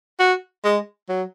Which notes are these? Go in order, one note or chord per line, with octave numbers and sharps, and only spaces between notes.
F#4
G#3
F#3